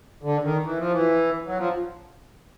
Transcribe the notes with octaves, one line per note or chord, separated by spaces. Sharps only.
D3
D#3
E3
F3
E3
F#3
F3